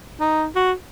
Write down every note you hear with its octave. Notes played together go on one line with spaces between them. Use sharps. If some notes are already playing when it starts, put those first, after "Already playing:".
D#4
F#4